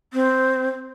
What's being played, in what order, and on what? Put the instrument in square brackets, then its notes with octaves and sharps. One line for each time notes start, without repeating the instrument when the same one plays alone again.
[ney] C4